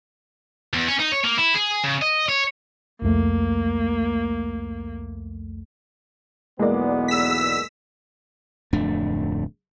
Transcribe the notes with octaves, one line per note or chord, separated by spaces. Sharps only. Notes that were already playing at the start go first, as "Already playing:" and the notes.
E2
C#4
D#4
C#5
A#3
E4
G#4
C#3
D#5
C#5
C2 F2 A3 A#3
B1 E2 G#3 A#3 B3 D5
E6 B6
D1 F2 A3 D4